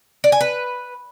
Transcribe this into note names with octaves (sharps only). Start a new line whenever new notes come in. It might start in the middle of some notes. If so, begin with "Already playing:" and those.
D5
G#5
B4